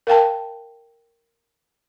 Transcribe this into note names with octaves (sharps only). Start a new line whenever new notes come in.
A#4 F5 G5 A5